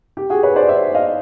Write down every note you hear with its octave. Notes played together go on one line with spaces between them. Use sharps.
G4
F#4 G#4
B4 C#5
C5 D5
D5 E5
D#5 F5